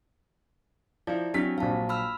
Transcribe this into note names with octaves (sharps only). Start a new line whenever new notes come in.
F3 E4 D5
F#3 C4 D4 G4 B6
A#1 F#3 F5 A5
B5 E6 F6